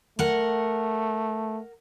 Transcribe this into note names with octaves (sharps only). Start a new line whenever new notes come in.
A3 A#4 F#5